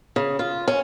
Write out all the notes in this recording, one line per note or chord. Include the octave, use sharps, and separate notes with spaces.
C#3
F4
C#4